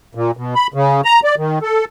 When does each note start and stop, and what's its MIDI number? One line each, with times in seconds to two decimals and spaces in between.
0.15 0.31 46
0.37 0.54 47
0.55 0.67 83
0.74 1.01 49
1.05 1.20 82
1.24 1.35 74
1.37 1.59 51
1.62 1.85 69